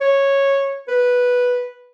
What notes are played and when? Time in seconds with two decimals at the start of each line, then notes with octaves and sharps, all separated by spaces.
0.01 C#5
0.88 B4